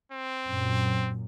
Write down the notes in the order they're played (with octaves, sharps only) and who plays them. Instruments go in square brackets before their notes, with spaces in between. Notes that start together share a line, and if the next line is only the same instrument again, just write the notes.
[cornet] C4
[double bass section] F#2 A#2